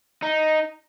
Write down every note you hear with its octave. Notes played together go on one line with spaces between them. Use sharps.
D#4